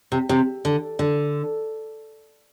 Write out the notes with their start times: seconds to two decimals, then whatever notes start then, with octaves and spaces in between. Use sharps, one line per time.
0.12 C3
0.29 C3
0.65 D3
0.99 D3